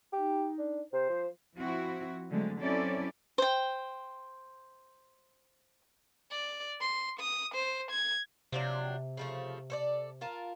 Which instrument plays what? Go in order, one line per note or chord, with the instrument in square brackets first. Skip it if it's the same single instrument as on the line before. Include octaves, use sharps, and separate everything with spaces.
[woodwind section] D#4 [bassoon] G4
[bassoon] D4
[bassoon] C3 [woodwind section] C5
[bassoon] F3
[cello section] F3 C4 E4 F#4
D3 F#3 G#3 A3 C4
F#3 C4 C#4 E4 A4 D5
[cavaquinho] C5 G5
[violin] D5
C6
D#6
C5
G#6
[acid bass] C3 [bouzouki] F3 F#3 D4
[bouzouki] C#3 F3 A3
A4 C5 D5
F4 A#4 A5